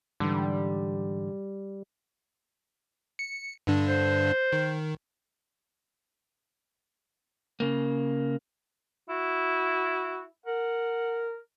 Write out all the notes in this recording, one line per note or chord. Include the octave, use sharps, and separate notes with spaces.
G#2 D3 E3 G3
C#7
G2 D3 D4
C5
D#3
C#3 A#3
E4 F#4
A#4 F#5